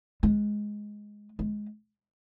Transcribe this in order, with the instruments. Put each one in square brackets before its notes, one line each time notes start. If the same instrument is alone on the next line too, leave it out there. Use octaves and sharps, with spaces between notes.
[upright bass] G#3
G#3